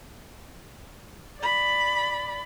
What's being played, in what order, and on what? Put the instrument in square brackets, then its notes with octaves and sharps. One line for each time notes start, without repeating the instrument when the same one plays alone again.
[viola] D5 B5